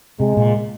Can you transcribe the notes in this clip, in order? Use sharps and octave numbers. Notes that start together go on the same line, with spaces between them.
C3 G#3
A#2